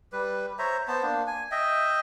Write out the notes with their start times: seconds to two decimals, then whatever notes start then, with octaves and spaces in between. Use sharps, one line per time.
0.13 G3 B4
0.59 C5 C#5 E5 A#5
0.88 B3 C5 A5
1.03 A#3 D4
1.27 G#5
1.51 D#5 E5 G5